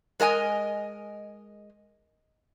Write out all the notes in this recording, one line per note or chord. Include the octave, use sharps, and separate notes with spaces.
G#3 A#4 D#5 G#5